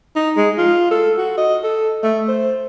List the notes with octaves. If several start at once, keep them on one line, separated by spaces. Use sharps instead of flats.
D#4
G#3
F4
A4
F#4
D#5
A4
A3
C5